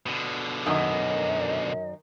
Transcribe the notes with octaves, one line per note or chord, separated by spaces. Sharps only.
B2 D3
F#2 D#3 D#5